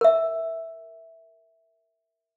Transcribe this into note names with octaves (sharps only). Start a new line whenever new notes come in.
A#4 E5